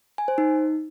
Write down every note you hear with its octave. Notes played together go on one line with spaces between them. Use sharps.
G#5
C5
D#4